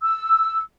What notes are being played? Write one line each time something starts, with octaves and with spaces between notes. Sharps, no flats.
E6